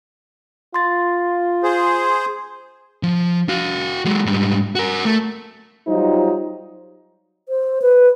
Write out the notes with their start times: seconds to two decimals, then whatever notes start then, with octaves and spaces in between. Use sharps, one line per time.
0.74 F4 C6 A6
1.63 G#4 C5
3.03 F3
3.49 F#4 F5
4.05 F#3 G#3
4.26 G#2 G3
4.75 F#4 A#4
5.05 A3
5.88 F#3 G3 D#4 F4 C5
7.49 C5
7.82 B4